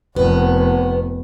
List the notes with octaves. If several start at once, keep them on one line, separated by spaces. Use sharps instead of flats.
F1 B3